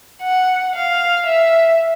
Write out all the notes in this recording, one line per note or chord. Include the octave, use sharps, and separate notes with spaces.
F#5
F5
E5